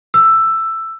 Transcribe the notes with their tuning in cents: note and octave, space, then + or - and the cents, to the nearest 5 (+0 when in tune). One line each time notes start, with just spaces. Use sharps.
E6 +10